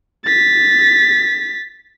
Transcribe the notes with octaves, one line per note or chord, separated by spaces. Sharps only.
A6 B6